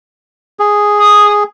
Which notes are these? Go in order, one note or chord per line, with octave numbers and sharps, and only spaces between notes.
G#4
D#6